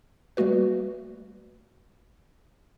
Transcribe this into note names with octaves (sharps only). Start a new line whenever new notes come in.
G3 A3 A#3 F#4 B4